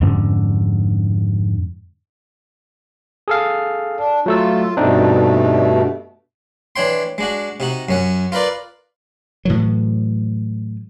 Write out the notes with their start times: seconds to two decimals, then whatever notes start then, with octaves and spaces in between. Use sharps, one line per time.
0.01 F2 G#2 D3 C#4
3.28 G#4 A4 F5
3.97 D4
4.26 F#3 A3 F4 E6
4.77 G2 B2 A3 C4 D4 D#4
6.76 E3 D4 C#5 G5 C6
7.18 G#3 D4 F#4
7.60 C3 D#4 F#4
7.89 F#2 C#4 F#5
8.32 F4 A#4 B4 D5
9.45 A2 E3 F#3